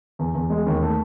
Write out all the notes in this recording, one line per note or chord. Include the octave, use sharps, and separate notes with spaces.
E2
E2
G#3
D#2
A3